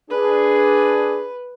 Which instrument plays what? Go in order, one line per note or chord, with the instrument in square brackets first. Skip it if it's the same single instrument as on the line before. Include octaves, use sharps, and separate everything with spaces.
[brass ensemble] D4 G#4 [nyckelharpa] B4